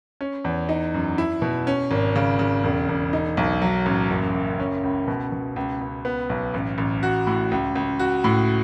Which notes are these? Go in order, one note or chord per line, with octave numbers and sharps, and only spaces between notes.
C#4
E2
D#4
F#2
E4
B2
C#4
G#1
C#3
C#3
E1
E1
D#4
B1
F#3
A1
F#1
F#1
C#4
C#2
B2
B2
C#2
C#2
B3
B1
A1
A1
F#4
A2
C#2
C#2
F#4
A2